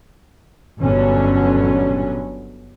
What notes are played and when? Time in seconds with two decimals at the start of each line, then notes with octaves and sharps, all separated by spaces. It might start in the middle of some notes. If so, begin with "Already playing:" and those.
0.79 G1 B2 D3 F#3 C#4